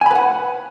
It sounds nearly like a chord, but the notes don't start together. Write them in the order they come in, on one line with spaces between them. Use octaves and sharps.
G#5 B5 B4 F#5